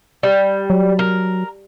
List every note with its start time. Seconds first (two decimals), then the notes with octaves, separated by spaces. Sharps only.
0.23 G3
0.70 F#3
0.99 A#4